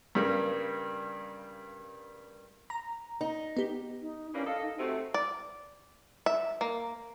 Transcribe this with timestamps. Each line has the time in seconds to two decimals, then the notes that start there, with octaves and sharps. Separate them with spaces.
0.15 G2 C#3 G3 A#3
2.70 A#5
3.21 D#4
3.57 B3 G4
4.02 D#4
4.34 E3 G3 A#3 C#4
4.47 A4 D#5 F5
4.62 D#4
4.79 C3 A3 F#4
5.14 D5
6.26 E5
6.61 A#3